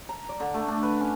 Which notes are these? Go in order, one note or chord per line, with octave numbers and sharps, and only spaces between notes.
A#5
D5
D3
A3
D4
B4
C#4